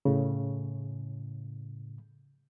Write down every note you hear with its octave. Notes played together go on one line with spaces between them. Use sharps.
A2 C#3